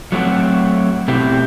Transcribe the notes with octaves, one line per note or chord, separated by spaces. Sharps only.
F#3 A3 C4 F#4
B2 A3 C4 E4 G4